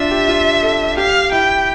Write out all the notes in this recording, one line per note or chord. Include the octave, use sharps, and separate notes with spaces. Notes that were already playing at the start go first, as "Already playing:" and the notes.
Already playing: D4 F4 E5
G4
F4
A4
G4 F5
E4 G5